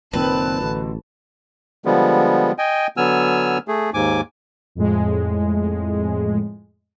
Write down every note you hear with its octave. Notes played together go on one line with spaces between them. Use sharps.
F#1 A#2 D#3 C4 B4 A5
A1 B2 D3
D3 F3 G3 G#3 B3
D#5 G5 G#5
D3 F#3 B3 G#5 E6 F6
A3 G#4
D#2 G#2 G#5 D6
F2 A2 G#3